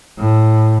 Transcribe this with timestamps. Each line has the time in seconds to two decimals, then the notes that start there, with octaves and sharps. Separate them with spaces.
0.19 A2